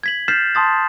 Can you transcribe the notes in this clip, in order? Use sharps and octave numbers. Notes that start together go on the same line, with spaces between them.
G#6 B6 F#7
F6 G6 A6 B6 C7 E7
A5 C6 D#6 A6